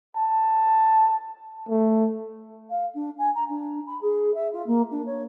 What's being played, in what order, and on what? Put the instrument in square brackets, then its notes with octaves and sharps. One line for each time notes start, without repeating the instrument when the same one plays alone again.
[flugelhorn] A5
A3
[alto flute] F5
D4
G#5
A#5
D4
B5
G#4
E5
F4
A#3
D4
C#5